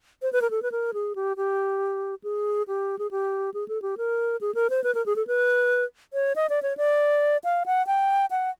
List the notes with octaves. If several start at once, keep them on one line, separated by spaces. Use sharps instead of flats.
C5
B4
A#4
A4
B4
A#4
G#4
G4
G4
G#4
G4
G#4
G4
G#4
A4
G4
A#4
G#4
A#4
C5
B4
A#4
G#4
A4
B4
C#5
D#5
D5
C#5
D5
F5
F#5
G5
F#5